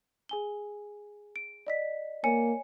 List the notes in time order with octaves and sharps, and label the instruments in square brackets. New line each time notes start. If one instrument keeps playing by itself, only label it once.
[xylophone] G#4 G#5 G7
D7
D5 D#5 B6
[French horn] A#3 [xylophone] C#5 G#5 C#7